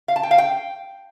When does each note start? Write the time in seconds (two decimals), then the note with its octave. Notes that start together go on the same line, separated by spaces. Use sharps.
0.08 F5
0.16 A5
0.23 G5
0.31 F5
0.38 G5